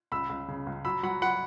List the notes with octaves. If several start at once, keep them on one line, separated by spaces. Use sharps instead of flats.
C#2 B5 E6
C#2
C#3
C#2
F#3 B5 E6
F#3 F#5 B5
F#3 F#5 B5